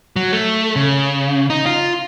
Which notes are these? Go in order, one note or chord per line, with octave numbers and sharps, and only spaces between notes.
F#3
A3
C#3
D#4
F4